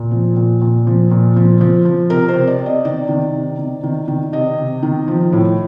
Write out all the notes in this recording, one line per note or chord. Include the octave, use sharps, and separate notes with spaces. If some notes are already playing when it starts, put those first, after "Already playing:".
Already playing: A#2
F3
A#2
A#2
F3
A#2
F3
F3
F3
C3 A#4
C5
C3
D5
C3
D#5
D#3 D5
D#3
C3
D#3
D#3
D#3
C3 D#5
C3
D#3
F3
A2